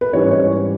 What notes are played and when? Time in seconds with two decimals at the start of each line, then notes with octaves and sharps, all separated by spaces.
0.01 B4
0.13 G#2 E3 G3 C#4 C#5
0.31 C#5